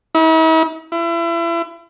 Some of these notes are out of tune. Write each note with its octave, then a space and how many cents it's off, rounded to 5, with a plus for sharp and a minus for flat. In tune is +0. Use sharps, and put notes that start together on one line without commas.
E4 -45
E4 +35